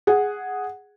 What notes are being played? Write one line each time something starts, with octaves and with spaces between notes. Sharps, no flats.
G#4 F#5